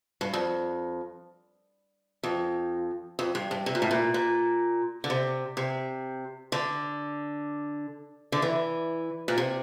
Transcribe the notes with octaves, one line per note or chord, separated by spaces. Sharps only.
G2
F2
F2
F2
G2
G2
C3
A#2
A2
A#2
A#2
D3
C3
C3
D3
D3
E3
A#2
C3